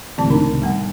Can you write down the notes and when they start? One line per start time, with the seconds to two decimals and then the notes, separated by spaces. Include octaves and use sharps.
0.18 C#2 A2 C3 D#3 F3 A5
0.30 D4 D#4 A#4
0.62 G3 B3 F#5